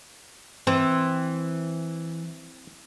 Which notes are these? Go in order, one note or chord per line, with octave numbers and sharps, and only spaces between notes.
E3 C4